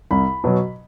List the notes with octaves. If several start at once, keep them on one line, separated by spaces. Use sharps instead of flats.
C2 B5
B2 F#3